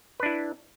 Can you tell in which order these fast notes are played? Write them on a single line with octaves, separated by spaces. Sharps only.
B4 D4 E4